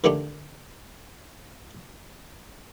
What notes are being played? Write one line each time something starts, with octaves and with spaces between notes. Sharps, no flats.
D3 D#3 A3 D4 G4